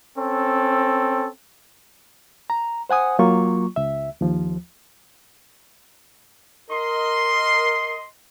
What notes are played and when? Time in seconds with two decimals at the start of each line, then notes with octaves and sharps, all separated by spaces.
0.17 C4 C#4 A4
2.50 A#5
2.89 C5 F#5 G#5 D#6
3.19 F#3 A#3 F4 C#6
3.76 C#2 E5
4.21 D#2 F3
6.70 A#4 D#5 C6